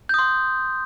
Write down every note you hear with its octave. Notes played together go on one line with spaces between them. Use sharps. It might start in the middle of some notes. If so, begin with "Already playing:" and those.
C6 D#6 G6